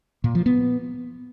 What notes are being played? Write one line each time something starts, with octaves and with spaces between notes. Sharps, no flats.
A#2
F3
B3